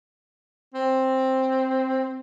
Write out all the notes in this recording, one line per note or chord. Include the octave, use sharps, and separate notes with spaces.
C4